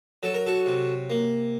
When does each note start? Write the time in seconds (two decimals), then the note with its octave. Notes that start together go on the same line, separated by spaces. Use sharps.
0.23 F#3 A4
0.34 A#4
0.46 F#4 A4
0.66 C3
1.10 A#3